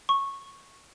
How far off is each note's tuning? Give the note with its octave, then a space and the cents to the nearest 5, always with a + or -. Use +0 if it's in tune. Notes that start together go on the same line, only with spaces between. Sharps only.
C#6 -10